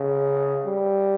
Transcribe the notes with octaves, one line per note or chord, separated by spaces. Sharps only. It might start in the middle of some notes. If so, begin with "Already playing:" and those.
Already playing: C#3
G3